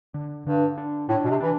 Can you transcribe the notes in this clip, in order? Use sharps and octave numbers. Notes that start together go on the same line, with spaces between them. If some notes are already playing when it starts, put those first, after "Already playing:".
D3
G2 D3
D4
A2 D4
B2
C3
E3 D4